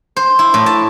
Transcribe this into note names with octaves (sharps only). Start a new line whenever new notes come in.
C5
E4
A2
A5